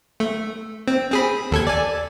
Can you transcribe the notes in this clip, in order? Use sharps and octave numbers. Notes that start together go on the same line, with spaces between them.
A3
C4
C4 G#4 B5
D#2 A4 G#6
D5 G#5